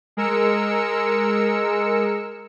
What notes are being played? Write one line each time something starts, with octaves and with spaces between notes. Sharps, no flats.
G#3 A#4 E6 C#7